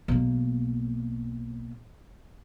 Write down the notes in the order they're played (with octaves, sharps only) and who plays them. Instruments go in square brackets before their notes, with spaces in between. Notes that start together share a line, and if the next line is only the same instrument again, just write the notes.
[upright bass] B1 A#3